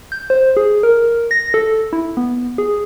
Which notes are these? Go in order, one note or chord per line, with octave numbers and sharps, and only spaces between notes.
G6
C5
G#4
A#4
A#6
A4
E4
B3
G#4